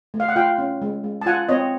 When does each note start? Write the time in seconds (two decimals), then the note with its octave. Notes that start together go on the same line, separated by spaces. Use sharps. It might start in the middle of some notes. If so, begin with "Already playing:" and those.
0.14 A3
0.20 F5
0.28 F#5
0.36 F4 F5 G5
0.58 C#4
0.82 G#3
1.04 G#3
1.21 A5
1.26 F4 F#5 G#5
1.49 C4 C#5 D#5